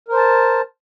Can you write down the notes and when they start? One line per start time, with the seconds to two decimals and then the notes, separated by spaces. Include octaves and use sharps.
0.08 A#4
0.13 C5
0.17 A5